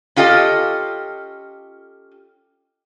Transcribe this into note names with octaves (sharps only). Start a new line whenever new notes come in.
C#4 F4 G4 A4 D#5